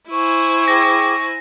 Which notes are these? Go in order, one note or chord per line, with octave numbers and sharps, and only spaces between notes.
E4 C5 G#5 C#6
G#4 G5 D6 A#6